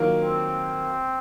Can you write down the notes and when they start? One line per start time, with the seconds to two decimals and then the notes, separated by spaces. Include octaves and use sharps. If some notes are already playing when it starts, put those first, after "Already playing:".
Already playing: D#3 F#3 A#3 F4 A#4
0.20 C4